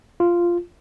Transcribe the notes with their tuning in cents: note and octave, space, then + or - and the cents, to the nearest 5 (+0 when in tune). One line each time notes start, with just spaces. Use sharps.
F4 -10